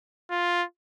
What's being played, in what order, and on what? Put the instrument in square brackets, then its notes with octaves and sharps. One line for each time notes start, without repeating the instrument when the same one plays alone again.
[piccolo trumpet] F4